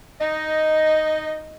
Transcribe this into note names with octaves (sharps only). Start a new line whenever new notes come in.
D#4 D#5